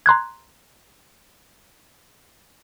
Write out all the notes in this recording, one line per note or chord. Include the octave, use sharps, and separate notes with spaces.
A#5 C6 F#6 G#6